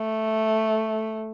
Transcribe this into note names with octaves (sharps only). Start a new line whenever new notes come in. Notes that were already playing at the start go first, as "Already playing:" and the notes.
Already playing: A3